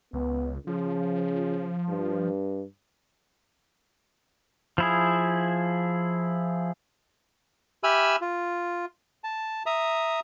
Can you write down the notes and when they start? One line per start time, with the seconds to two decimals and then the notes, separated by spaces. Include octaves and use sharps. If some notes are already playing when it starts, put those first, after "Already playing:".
0.13 C#2 B3
0.67 C#3 F3
1.89 G2
4.78 F3 E4 G#4
7.84 G4 E5 G#5 B5 E6 F6
8.21 F4
9.24 A5
9.66 E5 A#5 D#6